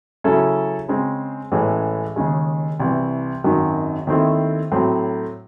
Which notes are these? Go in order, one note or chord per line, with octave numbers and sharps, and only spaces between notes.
C#3 F#3 C#4 E4 A4
C#3 G#3 C4
A1 A2 E3 G#3 C#4
D#2 C#3 G#3
C2 C3 E3
G#1 F#2 D#3 F#3
D#2 D#3 A3 C4 E4
A2 F#3 C4